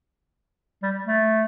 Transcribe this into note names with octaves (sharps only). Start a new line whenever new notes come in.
G3
A3